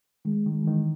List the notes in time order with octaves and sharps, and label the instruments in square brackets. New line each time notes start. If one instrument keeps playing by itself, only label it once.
[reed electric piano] D#3 [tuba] G#3
[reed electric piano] D#3
[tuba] G#3
[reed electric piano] E3
D#3